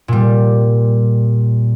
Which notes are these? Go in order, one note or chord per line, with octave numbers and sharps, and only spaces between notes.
A#2 G3